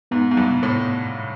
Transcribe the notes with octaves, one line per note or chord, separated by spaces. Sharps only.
G#2 B3
G#2
G2
C3
A2